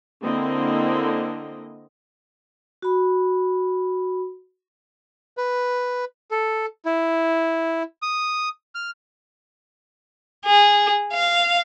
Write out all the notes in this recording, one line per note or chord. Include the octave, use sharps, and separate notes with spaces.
D3 A#3 C4 E4 D#5
F#4 B5
B4
A4
E4
D#6
F6
G#4
F5